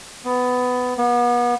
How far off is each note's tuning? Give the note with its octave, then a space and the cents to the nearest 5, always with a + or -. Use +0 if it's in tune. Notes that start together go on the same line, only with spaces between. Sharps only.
B3 +15
B3 -35